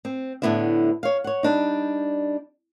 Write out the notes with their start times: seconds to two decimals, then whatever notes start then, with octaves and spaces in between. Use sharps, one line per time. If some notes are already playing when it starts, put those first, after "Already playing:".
0.05 C4
0.42 A2 D3 G#3 B3 E4 E5
1.03 C#5 F5
1.24 C#5 F#5
1.43 G3 D4 D#4